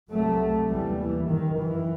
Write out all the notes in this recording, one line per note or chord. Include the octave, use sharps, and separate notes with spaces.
C2 C3 F#3 A3
D#2 E3 G3
E3
F#2 D#3
E3